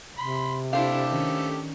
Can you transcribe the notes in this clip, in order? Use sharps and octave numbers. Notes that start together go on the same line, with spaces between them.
C3 B5 C6
A3 D4 E4 G4 A4 C5 F5
D#3 C#4